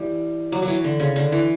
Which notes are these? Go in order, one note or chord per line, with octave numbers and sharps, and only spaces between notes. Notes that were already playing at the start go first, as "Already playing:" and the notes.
Already playing: E3 G3
F#3
F#3
E3
D3
C#3
D3
E3